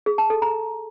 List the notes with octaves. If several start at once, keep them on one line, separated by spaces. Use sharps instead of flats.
G#4
A5
A4
A#5